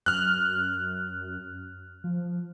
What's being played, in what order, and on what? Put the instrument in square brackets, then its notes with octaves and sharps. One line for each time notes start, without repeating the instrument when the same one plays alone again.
[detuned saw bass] F#2 [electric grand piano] F6 F#6
[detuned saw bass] F3